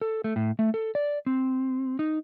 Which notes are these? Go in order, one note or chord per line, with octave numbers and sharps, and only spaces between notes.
A4
A3
A2
A3
A4
D5
C4
D#4